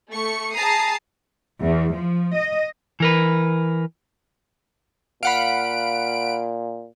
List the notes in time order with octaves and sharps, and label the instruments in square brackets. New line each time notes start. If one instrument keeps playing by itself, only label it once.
[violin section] A3 C#6 C#7
G#4 A5 A#5 D#6 C7
[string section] E2
F3
D#5
[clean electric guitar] E3 A#4 B4
[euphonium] A#2 [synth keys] F5 F#5 B5 [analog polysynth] D7